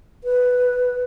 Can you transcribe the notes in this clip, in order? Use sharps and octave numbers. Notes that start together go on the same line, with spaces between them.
B4